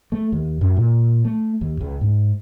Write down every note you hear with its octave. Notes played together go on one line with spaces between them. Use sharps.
A3
D#2
F#2
A#2
A3
D#2
C#2
G#2